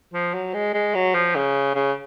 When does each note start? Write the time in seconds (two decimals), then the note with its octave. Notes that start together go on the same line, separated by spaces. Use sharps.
0.13 F3
0.34 F#3
0.54 G#3
0.74 G#3
0.94 F#3
1.14 F3
1.35 C#3
1.75 C#3